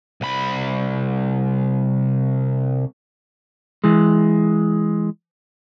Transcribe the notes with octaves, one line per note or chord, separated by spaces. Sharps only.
C2 B5
E3 G#3